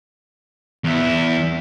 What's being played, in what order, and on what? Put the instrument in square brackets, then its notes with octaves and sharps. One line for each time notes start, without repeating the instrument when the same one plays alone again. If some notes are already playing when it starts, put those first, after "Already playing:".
[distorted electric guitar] E2 E4